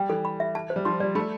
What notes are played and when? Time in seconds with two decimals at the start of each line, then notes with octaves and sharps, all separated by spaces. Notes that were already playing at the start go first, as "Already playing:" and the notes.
Already playing: G3 G5
0.09 E3 A4
0.25 B5
0.40 E5
0.55 A5
0.70 C5
0.76 G3
0.85 F3 C6
1.00 G3 D5
1.15 A3 B5